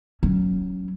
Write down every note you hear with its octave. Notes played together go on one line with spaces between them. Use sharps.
F#3 C#4